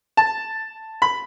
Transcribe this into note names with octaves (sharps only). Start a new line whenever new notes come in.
A5
B5